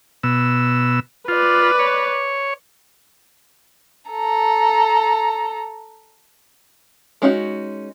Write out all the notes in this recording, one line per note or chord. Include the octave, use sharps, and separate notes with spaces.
B2 E6
F4 B4 D5
C#5
A4 A#5
G#3 C#4 D#4 F4 F#4